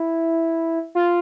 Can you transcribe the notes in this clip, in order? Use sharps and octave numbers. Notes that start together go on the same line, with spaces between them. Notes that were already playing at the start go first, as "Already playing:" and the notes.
Already playing: E4
F4